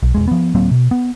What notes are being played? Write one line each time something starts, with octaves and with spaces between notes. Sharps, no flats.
B1
E1 D#2 G#3
F3 B3
D1 F#3 A#3 C4
B2
B3